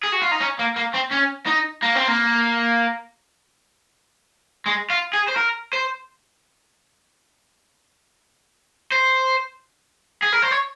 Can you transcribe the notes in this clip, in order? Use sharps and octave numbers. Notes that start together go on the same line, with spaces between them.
G#4
F#4
F4
D#4
C#4
A#3
A#3
C4
C#4
D#4
A#3
C4
A#3
G#3
F4
G#4
C5
A#4
C5
C5
G#4
A#4
C5
C#5